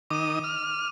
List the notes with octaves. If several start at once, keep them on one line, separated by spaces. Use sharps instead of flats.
D#3 D6 D#6 D#7
F6